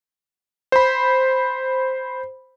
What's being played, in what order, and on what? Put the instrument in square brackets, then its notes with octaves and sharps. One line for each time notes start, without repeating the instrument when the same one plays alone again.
[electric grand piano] C5 B5